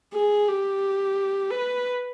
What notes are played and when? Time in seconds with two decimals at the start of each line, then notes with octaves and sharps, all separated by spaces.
0.14 G#4
0.48 G4
1.51 B4